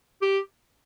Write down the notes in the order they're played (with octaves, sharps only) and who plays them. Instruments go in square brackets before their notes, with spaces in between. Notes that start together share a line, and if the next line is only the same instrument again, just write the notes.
[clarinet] G4